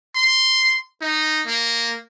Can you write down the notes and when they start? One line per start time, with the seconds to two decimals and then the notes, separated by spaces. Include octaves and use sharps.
0.15 C6
1.01 D#4
1.46 A#3